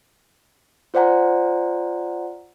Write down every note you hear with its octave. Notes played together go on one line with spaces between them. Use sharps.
F4 C5 D5 F#5 G#5 A#5